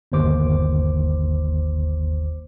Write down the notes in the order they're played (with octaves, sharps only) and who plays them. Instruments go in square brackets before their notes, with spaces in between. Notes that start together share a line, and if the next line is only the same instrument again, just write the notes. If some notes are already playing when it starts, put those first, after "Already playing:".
[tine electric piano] G1 D#2 C5 D6